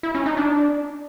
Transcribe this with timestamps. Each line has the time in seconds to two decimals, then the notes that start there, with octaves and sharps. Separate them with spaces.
0.03 E4
0.15 C#4
0.26 D#4
0.37 D4